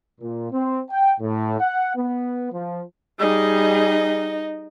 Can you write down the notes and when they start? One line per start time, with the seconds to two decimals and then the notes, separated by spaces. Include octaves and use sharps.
0.21 A#2
0.52 C4
0.91 G5
1.20 A2
1.60 F#5
1.96 B3
2.52 F3
3.19 G3 D#4 G#4 D#5